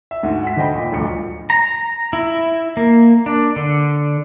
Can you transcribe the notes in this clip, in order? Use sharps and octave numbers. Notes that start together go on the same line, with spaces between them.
E5
D2 G#2 F#4
F#5 B6
D3 C5 D#5 G5 B5
A#2 D#5
D#1 D2 G2 F3 C#7
A#5
E4
A#3
D4
D3